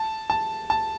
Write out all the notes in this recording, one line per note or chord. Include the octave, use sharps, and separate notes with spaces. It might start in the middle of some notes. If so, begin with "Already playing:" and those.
Already playing: A5
A5
A5